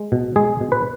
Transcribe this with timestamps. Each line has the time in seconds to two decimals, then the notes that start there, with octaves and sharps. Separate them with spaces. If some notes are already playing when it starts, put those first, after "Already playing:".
Already playing: G#3
0.12 B2
0.36 G#3 G#4
0.61 B2
0.72 B4